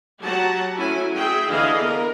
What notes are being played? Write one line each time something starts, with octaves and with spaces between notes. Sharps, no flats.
F#3 G4 F#5 A5 A#5
F#3 A3 C#4 E4 G#5
F#4 G#4 E5 G5
D3 E3 E4 G#4 D#5 F5
B3 A#4